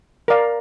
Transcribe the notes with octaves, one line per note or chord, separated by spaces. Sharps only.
A#4 D5 F5